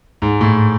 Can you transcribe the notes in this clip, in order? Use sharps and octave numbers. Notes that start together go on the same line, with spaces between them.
G#2
A2